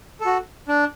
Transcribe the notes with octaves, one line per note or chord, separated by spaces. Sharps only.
A4
F#4
D4